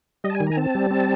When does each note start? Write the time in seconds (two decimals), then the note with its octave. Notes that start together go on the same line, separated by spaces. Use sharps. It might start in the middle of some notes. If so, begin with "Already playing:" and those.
0.24 G3 D#5
0.30 A5
0.35 G#5
0.40 D#3
0.47 G#5 A#5
0.57 C4 A5
0.75 G3
0.91 C4